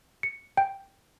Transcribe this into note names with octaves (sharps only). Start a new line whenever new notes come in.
C#7
G5